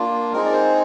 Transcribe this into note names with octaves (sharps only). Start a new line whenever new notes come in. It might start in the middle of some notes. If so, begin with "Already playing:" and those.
Already playing: A#3 D4 F4
G#3 C4 D#4 G#4 A#4
D5
C5